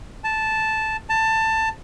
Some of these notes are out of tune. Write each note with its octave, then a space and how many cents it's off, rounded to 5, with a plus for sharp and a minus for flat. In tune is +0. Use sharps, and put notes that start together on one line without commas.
A5 -5
A5 +15